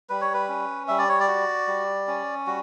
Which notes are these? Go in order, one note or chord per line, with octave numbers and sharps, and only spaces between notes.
G3 B4
C#5
B4
C#4
G3 E5
D5
C#5
D5
F#4
G3
C#4
G3 F#4